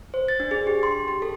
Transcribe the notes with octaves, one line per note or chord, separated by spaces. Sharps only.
C5
A6
D4
G#4
G4
C6
G4
A4